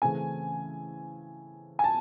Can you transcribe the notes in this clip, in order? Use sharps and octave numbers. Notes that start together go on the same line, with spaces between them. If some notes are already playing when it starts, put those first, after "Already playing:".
C#3 E3 A3 C4 G#5
G#5
A5